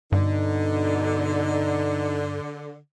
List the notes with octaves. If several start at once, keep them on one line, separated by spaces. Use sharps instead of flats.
G2 B2 D3 D#4